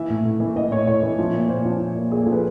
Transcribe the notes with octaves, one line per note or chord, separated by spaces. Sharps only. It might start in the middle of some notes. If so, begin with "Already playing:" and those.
Already playing: E3 E5
A2
A2
E3
E3 D#5
A2 C#5
A2 C#5
E3
F3
A#2
A#2 C5
F3
F3
A#2
A#2 G#4
A4
F3
B4